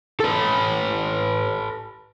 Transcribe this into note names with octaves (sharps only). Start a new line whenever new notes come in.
A4 B4